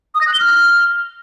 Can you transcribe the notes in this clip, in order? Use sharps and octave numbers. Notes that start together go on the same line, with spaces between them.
D#6
A#6
F#6
G7
F6